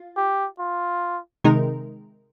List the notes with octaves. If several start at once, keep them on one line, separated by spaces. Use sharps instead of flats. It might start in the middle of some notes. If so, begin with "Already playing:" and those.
Already playing: F4
G4
F4
C3 D#3 G#3 D#4 A#4